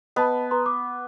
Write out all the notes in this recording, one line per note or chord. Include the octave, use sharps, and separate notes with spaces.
B3 D#5 A5 B5
B4 A#5 C6
D6